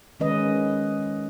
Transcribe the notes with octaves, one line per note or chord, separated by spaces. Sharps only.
D#3 G#3 C#4 B4 D#5